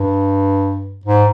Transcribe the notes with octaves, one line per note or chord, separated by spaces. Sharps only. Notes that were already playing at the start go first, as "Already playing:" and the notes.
Already playing: G2
G#2